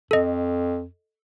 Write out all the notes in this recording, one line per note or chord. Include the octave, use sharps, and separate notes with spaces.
F2 A4 D#5